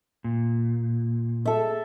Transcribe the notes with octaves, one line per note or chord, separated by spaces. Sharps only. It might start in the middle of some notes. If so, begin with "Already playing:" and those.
A#2
A4 E5